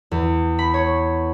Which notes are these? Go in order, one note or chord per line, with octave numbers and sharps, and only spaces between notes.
E2
B5
C#5